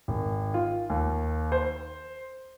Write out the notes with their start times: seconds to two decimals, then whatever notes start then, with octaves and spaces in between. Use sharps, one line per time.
0.08 G#1
0.54 F4
0.90 D#2
1.52 C5